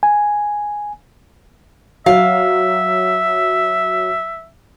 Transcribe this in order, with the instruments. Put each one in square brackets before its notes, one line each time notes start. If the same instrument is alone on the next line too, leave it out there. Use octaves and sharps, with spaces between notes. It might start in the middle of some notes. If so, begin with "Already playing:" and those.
[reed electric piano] G#5
[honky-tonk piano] F#3 [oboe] E5 [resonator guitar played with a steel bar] F5